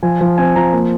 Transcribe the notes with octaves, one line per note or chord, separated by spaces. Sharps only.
F3 G#5
F3
C4 G#5
F3 A#5
A#3